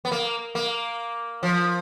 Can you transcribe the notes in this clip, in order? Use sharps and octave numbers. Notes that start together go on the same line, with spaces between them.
B3
A#3
A#3
F3